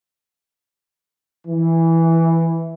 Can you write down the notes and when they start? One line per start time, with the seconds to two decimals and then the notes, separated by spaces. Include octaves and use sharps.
1.48 E3